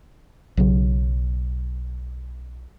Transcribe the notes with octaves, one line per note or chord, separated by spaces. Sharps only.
B1 C#3 F#3